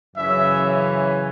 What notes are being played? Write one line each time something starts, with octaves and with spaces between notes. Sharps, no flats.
F#2 C#3 E3 C#4 E5